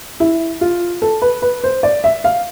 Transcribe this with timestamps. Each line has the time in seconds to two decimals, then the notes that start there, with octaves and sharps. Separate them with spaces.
0.20 E4
0.61 F4
1.02 A4
1.22 B4
1.42 B4
1.64 C5
1.83 D5
2.04 E5
2.24 F5